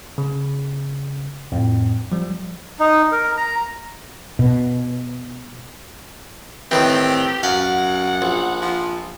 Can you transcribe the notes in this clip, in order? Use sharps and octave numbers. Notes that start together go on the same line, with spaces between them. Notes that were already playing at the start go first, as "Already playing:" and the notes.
C#3
F2 A2
F3 G3
D#4
A#4
A#5
B2
A2 D#3 E3 C4 G4
F#2 F5 F#5
A#1
F3